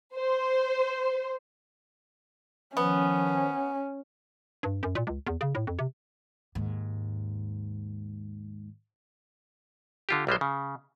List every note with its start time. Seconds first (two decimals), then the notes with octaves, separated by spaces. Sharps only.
0.16 C5
2.77 D#3 F3 B3 C#4
4.63 G2
4.83 F#2
4.95 A#2
5.07 C#2
5.27 E2
5.41 C#3
5.55 A2
5.67 F2
5.79 C3
6.55 D#2 G#2
10.09 D3 F4 G4
10.27 B1 G3 G#3 C5
10.41 C#3